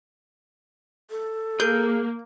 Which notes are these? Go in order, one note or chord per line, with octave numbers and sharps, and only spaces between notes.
A4
A#3 G#4 A#4 G6